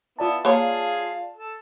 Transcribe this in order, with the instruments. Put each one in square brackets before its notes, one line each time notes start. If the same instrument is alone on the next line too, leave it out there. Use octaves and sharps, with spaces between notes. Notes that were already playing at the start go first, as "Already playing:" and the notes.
[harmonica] B3 E4 [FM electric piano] F4 D5 A5
[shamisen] A#3 C#5 [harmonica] G#4 F5
[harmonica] A4